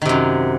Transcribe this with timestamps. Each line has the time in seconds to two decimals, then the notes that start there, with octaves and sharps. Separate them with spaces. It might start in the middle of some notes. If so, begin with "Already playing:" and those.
0.02 D#3
0.05 C3
0.09 F#2